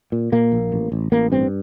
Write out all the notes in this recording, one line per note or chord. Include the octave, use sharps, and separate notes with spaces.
A#2
A#2 A#3
A#1
A1
A1
A1 A#3
G2 C4